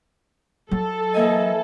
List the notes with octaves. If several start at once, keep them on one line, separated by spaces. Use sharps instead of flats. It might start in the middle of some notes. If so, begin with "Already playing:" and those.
F#3 A4
E3 A#3 D#5 G#5